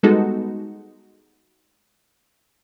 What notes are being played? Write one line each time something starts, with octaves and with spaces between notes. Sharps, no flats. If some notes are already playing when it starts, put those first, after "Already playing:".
G3 G#3 B3 D#4 F#4 A4